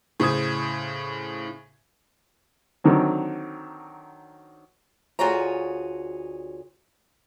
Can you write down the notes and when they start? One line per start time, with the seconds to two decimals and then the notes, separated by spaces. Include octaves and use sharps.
0.20 A2 C#3 C5 D#6 G#6
2.84 D3 D#3 F#3 C4
5.19 D2 F4 F#4 G#4 C#5 A#5